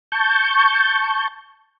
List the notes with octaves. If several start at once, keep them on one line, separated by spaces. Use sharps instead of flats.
A5 C#6 G6